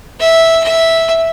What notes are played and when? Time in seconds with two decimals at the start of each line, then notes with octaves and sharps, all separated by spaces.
0.20 E5
0.63 E5